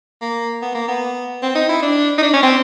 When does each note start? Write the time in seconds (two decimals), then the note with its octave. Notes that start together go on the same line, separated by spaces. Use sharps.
0.21 A#3
0.62 B3
0.74 A#3
0.88 B3
1.43 C4
1.55 D#4
1.69 E4
1.82 D4
2.18 D#4
2.22 D4
2.33 C#4
2.43 C4